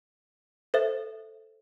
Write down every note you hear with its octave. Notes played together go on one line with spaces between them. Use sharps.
A4 C5 E5